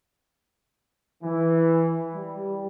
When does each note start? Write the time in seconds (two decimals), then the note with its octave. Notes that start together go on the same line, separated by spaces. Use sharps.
1.23 E3
2.15 G3